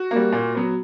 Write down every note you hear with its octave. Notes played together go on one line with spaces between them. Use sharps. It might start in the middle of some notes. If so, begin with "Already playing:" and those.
Already playing: F#4
G3 A#3
A#2
F#3 B3